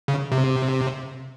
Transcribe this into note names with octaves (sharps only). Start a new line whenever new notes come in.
C#3
C3